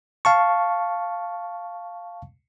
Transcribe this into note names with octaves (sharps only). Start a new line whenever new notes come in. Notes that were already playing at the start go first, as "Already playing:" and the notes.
F5 A5 C#6